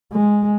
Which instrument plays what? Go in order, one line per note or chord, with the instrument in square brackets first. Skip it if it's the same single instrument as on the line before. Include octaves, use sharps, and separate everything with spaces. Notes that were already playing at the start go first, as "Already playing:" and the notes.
[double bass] G#3